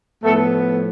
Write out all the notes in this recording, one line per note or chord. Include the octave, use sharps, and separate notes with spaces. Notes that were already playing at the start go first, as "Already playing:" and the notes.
A2 F3 A3 B3 A4